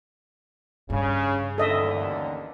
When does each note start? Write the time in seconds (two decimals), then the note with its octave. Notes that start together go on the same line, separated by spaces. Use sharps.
0.90 G2 C#3
1.58 A1 D#2 D3 A4 D#5 E5